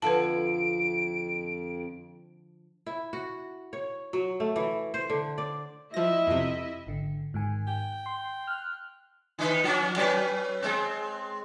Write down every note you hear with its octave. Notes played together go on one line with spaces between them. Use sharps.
F2 D3 F3 B4 A5 D7
E4
F#4
C#5
F#3
A3
E3
C5
D3
D5
F3 E4 D#5 E5 A#6
F2 C3
G#1 D3
G#2 D#3 G#5
G5
C6
F6 F#6
D#3 D#4 B4
F3 C#4
F#3 C#4 B4
G#3 C4